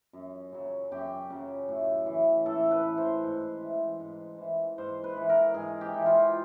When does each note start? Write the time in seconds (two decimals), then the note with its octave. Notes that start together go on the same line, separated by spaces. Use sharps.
0.13 F#2
0.53 C#3 F#3
0.91 F#2 G4
1.30 C#3 F#3
1.69 A2
2.07 E3
2.46 A2 A4
2.71 B4
2.84 E3
2.98 C5
3.23 G#2
3.61 E3
4.00 G#2
4.38 E3
4.78 G#2 C5
5.04 B4
5.17 E3
5.29 A#4
5.54 G#2 G#4
5.81 G4
5.94 E3
6.06 F4